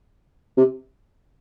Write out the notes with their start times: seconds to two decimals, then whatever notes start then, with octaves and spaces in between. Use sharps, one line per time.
0.57 C3